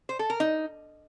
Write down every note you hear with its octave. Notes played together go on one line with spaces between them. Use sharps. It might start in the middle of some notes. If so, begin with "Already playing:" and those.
C5
A4
A#4
D#4